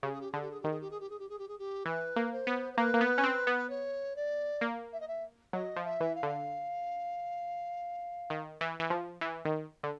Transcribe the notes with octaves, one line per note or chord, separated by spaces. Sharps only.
C#3 G4
G#4
G4
D3 G#4
G4
G#4
D#3 G4
G#4
G4
G#4
G4
G#4
G4
G#4
G4
G#4
G4
E3 B4
A#3
C5
B3
C5
A#3 B4
A#3
B3
C#4
C4
B3
C#5
D5
A#3
E5
D#5
E5
F#3 D#5
F3
E5
E3
F5
D3
D#3
E3
E3
F3
E3
D#3
D3